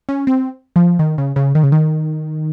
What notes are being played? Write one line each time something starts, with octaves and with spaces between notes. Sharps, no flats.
C#4
C4
F3
D#3
C#3
C#3
D#3
C#3
D#3